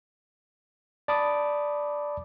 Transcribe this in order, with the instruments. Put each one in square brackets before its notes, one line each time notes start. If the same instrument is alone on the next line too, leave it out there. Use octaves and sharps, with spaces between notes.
[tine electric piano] D5 A5 B5 D6 D#6